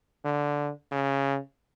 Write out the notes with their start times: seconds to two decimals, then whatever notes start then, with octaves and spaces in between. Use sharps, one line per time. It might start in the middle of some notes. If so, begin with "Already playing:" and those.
0.25 D3
0.92 C#3